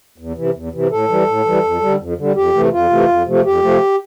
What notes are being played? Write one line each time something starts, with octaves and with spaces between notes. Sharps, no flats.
E2
C3 E3
E2
C3 E3
A2 A4
E3 G3
A2
E3 G3
F2
D3 G3
F2
D3 G3
F2 G4
C3 E3 A3
F2 F4
C3 E3 A3
F2
C3 F3 A3
F2 G4
C3 F3 A3